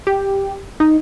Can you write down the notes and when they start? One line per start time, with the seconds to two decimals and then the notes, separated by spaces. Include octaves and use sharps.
0.07 G4
0.80 D#4